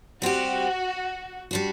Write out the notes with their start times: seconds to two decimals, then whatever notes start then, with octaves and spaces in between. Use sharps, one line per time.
0.21 G3 C4 F#4 G4
1.51 G3 D4 F#4